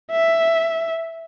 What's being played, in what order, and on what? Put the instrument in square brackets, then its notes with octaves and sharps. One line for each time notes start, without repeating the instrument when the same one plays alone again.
[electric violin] E5